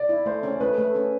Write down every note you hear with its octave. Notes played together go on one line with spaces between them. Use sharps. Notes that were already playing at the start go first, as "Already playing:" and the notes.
Already playing: D5
E4
A3 C5
C#4
A3 B4
A3
C#4